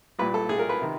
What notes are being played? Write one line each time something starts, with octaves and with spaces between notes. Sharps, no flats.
C2 A#2 B4
A4
C2 A#2 G#4
A#4
B4
C3 D#3